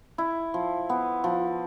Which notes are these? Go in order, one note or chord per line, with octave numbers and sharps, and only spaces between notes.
E4
F3
B3
F3